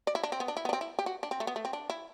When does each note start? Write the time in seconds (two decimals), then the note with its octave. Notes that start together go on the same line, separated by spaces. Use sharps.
0.07 D5
0.15 E4
0.24 D4
0.32 C4
0.40 B3
0.48 D4
0.57 E4
0.65 B3
0.69 D4
0.73 C4
0.81 E4
0.99 G4
1.06 F#4
1.23 D4
1.31 C4
1.40 A3
1.47 B3
1.56 A3
1.65 C4
1.73 D4
1.90 E4